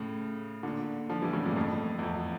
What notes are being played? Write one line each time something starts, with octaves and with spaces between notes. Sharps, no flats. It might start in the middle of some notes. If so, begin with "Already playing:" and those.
Already playing: A2 C#3
A#2 D3
D3 F3
E3 G3
A2 C#3
G2 A#2
F2 A2
E2
F2